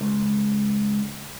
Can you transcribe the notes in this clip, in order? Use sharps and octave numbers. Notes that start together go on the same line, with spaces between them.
C#2